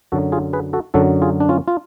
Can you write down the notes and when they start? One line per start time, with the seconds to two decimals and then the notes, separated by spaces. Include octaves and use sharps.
0.12 F#2 D3 F#3 F#4 A4
0.32 F4 G#4
0.53 G#4 B4
0.73 F#4 A4
0.94 F#2 D3 F#3 F#4 A4
1.22 F4 G#4
1.40 D4
1.49 C#4 F4
1.68 F4